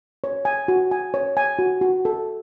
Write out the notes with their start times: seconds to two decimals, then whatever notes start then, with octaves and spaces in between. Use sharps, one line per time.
0.24 C#5
0.45 G#5
0.68 F#4
0.91 G#5
1.14 C#5
1.37 G#5
1.59 F#4
1.81 F#4
2.05 A4